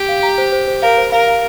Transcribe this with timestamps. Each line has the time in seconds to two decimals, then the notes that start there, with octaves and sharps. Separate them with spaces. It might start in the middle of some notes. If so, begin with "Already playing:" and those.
Already playing: G4
0.09 F5
0.23 A#5
0.38 C5
0.52 C5
0.67 C5
0.82 A#4 F5
0.97 C5
1.12 A#4 F5
1.27 F5